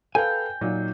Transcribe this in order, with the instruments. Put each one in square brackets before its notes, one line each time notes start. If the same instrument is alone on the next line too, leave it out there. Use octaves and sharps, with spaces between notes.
[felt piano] A4 B4 F5 [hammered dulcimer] G5 [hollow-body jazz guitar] G#5
[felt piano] A#2 F#3 D#4